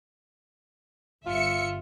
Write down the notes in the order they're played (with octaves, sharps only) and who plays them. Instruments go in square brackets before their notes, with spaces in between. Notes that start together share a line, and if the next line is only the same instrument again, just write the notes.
[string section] G1 E5 C#7 [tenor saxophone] F4